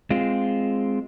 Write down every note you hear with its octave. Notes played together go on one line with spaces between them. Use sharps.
G#3 C4 F4